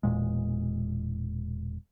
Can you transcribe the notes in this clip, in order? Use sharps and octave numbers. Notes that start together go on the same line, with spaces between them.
E1 A#2 G#3